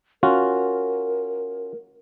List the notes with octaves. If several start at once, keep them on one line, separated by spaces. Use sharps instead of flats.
C#4 F4 F#4 A#4